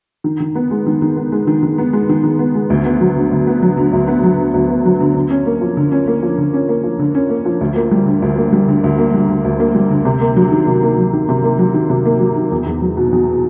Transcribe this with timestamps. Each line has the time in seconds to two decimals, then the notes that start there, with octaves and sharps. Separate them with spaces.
0.24 D#3
0.40 D#3
0.55 B3
0.71 G#3
0.86 D#3
1.02 D#3
1.17 B3
1.32 G#3
1.47 D#3
1.63 D#3
1.78 B3
1.93 G#3
2.09 D#3
2.24 D#3
2.39 B3
2.55 G#3
2.70 D2
2.85 B3
3.01 F#3
3.16 D3
3.32 D2
3.47 B3
3.62 F#3
3.77 D3
3.93 D2
4.08 B3
4.23 F#3
4.38 D3
4.54 D2
4.70 B3
4.85 F#3
5.00 D3
5.15 D3
5.30 C#4
5.46 A#3
5.61 F3
5.77 D3
5.92 C#4
6.08 A#3
6.23 F3
6.38 D3
6.54 C#4
6.69 A#3
6.84 F3
6.99 D3
7.15 C#4
7.30 A#3
7.45 F3
7.61 D2
7.76 A#3
7.91 G3
8.06 D3
8.22 D2
8.37 A#3
8.52 G3
8.68 D3
8.84 D2
8.98 A#3
9.14 G3
9.29 D3
9.45 D2
9.60 A#3
9.75 G3
9.91 D3
10.05 C3
10.21 A#3
10.36 F#3
10.52 D#3
10.67 C3
10.83 A#3
10.98 F#3
11.13 D#3
11.29 C3
11.44 A#3
11.59 F#3
11.74 D#3
11.90 C3
12.05 A#3
12.20 F#3
12.36 D#3
12.52 E2
12.66 E2
12.82 F#3
12.97 B2
13.12 E2